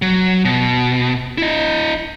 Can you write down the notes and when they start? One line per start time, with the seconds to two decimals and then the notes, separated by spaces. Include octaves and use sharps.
0.02 F#3
0.45 B2
1.38 E4 D#5